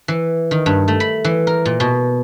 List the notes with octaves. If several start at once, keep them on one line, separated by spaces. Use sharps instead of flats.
E3
D#3
G2
A3
B5
E3
A#4
A#2
B2